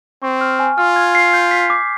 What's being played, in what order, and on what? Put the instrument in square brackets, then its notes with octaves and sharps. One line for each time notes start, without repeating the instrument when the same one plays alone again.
[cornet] C4 [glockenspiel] C#6
[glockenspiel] F6
G#5
[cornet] F4 [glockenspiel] F6
[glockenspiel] G#6
C7
G6
B6
D6